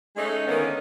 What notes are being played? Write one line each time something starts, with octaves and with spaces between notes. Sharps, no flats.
G#3 A3 C#4 D#4
D3 D#3 A#3 B3 C#4